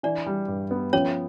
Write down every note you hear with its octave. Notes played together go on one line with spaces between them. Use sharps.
E3 D4 D5
G3
G2
B3
F3 C#4 C#5